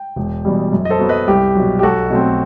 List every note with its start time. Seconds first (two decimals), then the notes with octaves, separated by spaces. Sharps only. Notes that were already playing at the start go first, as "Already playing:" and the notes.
Already playing: G5
0.16 E1
0.45 E2 B2 G3
0.73 F#2
0.85 D#5
0.90 A4 C5
0.99 F#3 B3
1.09 B4 D#5
1.27 C2 G4
1.55 B2 F#3
1.79 G4
1.83 B1 F#4 A4
2.10 B2 F#3 A3 C4